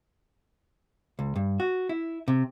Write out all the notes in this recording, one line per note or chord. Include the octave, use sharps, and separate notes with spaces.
C#2
G2
F#4
E4
C3